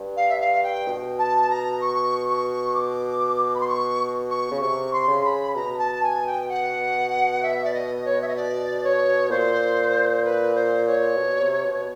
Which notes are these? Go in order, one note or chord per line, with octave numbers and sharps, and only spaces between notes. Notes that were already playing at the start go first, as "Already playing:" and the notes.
Already playing: G2
F5
E5
F5
G5
B2
A5
A#5
C#6
C#6
D6
B5
C6
C#6
C#6
C#3
C3 C#6
C6
C#3
B5
B2 A#5
A#5
A5
G#5
G5
F#5
E5
D5
D#5
C#5
E5
D#5
D5
C#5
A#2 C5
B4
C5
C#5
B2
C3
B2